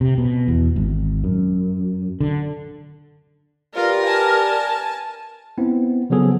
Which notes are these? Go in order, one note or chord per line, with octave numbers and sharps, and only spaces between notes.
C3
B2
E2
G#1
F#2
D3
F4 G4 A#4 B4 D5
G#5 A5
B3 C4 E4
C#3 F3 F#3 B3 G#4 A4